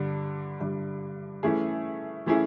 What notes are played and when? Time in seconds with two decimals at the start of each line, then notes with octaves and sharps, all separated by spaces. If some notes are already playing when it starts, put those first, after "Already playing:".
Already playing: G2 D3 G3
0.60 G2 D3 G3
1.43 E3 A3 C#4 E4 G#4
2.26 E3 A3 C#4 E4 G#4